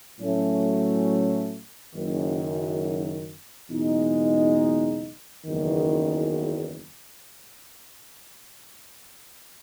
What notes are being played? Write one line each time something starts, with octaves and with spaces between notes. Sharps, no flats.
A2 F#3 A3 C#4
F#1 F#2 D#3
F#1 E2 B2 G#3 D#4
F#1 E2 D#3